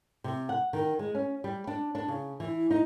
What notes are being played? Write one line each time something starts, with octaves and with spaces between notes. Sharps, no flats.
C3
F#5
D#3
G#3
C#4
G3
D4
D4
C#3
E3
D#4